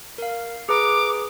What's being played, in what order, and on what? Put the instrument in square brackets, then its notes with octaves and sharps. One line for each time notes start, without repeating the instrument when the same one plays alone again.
[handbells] A#4 F5
[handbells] G#4 B4 A#5 [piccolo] D6